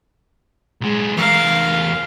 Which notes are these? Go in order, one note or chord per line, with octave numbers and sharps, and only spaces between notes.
B1 G#3
E2 A#4 F5